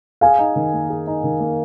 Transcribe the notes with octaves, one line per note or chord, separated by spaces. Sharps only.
G#4 F5 G#5
D#4
D#3
A#3
G#4
D#4
D#3
A#3